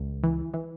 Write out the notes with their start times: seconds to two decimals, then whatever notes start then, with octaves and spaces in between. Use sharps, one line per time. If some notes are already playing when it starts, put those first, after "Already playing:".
Already playing: C#2
0.23 E3
0.54 E3